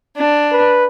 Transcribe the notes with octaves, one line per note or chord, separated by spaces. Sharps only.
D4
B4